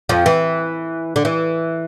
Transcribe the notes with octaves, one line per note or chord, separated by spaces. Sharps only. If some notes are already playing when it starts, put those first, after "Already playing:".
F2 F3
E3
D3
E3